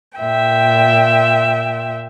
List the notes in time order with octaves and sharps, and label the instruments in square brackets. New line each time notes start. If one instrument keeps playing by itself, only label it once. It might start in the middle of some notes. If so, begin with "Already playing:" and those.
[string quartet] A#2 E5 G5